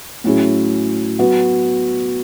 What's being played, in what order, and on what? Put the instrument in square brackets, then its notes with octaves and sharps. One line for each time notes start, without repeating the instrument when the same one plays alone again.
[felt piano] A2 F#3 C#4 E4 G#4
F#3 B3 F#4